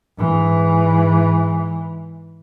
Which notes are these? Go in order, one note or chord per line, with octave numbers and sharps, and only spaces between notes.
G#2 E3